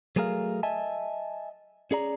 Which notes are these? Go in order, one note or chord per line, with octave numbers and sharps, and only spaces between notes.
F#3 A3 G#4 A#4 F5
D#5 E5 G#5 A5
C#4 G#4 D5 A#5